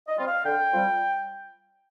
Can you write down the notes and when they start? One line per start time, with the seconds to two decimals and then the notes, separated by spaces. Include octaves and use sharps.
0.08 D#5
0.18 G3 C4 F4
0.27 F5
0.45 D3 G5
0.72 G3 C4 F4